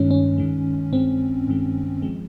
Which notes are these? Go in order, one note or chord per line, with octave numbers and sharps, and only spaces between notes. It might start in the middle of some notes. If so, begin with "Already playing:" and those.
Already playing: G2 D#3 G#3 C#4
C#4
G2 D#3 G#3
G2 D#3 G#3 C4
G2 D#3 G#3
F3 G#3